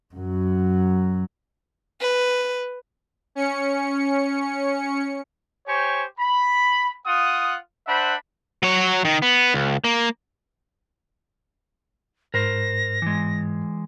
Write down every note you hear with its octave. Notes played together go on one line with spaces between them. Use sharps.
F#2 F#3
B4
C#4 C#7
G4 C5 C#5 G#5 C#6
B5
F4 F#5 D#6
D4 C5 E5 F#5 B5
F#3 C#5
D#3
B3
C#2
A#3
G#2 A#4 C5 A#6
E3 G#3